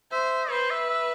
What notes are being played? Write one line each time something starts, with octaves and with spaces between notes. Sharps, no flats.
C5 E5
B4 C5
E5
E5